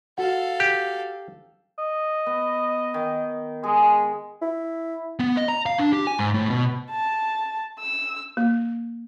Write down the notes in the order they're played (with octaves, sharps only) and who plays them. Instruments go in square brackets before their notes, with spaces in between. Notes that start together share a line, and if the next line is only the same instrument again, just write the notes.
[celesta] F#4 F#5 [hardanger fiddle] A4 F5
[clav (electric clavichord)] G4
[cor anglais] D#5
[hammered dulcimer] B3
D#3
[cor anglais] G#3 [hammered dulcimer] G#4
[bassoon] E4
[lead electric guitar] B3
D#5
A#5
F5
D4
G4
G#5
G#2
A2
B2
[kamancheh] A5
E6
[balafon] A#3